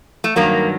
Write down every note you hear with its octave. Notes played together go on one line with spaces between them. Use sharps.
A3
G2 D#3 F#3 A#3